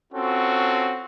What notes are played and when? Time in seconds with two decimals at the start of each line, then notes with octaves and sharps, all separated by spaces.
0.13 C4 C#4 F4 F#4 A4